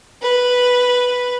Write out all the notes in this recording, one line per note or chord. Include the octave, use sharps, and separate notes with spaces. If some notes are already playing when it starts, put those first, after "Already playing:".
B4